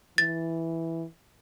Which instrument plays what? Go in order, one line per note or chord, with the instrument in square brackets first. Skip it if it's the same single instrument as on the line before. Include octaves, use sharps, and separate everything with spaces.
[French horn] E3 [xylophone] A6